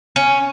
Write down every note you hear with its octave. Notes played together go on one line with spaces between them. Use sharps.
C#4